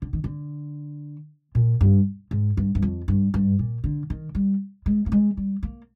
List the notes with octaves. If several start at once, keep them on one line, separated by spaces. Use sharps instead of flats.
D3
D#3
D3
A#2
G2
G#2
G2
G2
F2
G2
G2
A#2
D3
D#3
G3
G#3
A#3
G#3
G3
A#3